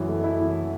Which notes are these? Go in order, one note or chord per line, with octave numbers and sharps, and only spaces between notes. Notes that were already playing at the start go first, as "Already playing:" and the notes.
Already playing: F#2 E3
A3
E4
E3